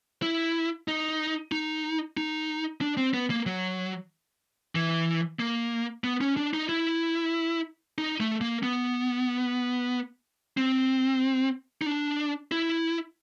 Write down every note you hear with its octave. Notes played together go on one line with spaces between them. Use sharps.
E4
D#4
D#4
D#4
D4
C4
B3
A#3
F#3
E3
A#3
B3
C#4
D4
D#4
E4
D#4
A3
A#3
B3
C4
D#4
D4
E4